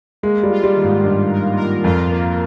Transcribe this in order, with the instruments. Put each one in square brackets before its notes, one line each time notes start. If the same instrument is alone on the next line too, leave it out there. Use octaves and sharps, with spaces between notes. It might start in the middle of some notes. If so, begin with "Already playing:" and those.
[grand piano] G#3 [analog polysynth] A#3
[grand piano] G3
[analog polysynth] F4
[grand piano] G3
[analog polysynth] D#3
[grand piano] G#2
[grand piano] G2 [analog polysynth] D#3
[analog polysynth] A#4
A#4
[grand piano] F2 [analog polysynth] F4
[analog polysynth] A#3